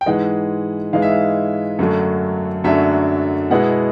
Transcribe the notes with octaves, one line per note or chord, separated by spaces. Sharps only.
G5
G#2 E3 G#3 F#5
G#2 E3 G#3 F5
E5
F5
F#2 D3 F#3 A3 D4
F#2 D3 F#3 A3 D4 E5
B2 G#3 B3 E4 F#5